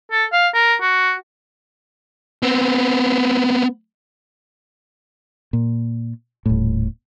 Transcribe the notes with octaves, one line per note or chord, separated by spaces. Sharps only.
A4
F5
A#4
F#4
B3 C4
A#2
D#1 A2